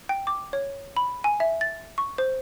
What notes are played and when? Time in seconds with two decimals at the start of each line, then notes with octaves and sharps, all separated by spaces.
0.09 G5
0.27 D6
0.53 C#5
0.97 B5
1.24 G#5
1.40 E5
1.61 A6
1.98 C#6
2.18 C5